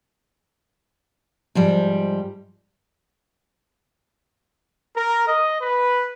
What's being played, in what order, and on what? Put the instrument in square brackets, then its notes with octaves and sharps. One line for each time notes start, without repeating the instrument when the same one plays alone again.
[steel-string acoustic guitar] G#2 F3 G3
[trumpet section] A#4
D#5
B4